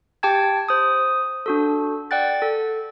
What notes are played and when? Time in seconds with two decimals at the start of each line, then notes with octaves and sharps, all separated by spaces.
0.23 G4 G5 A5 G#6
0.69 C5 D#6
1.46 D4 F#4 A4
2.11 D5 F#5 G5 F#6 A6
2.42 A4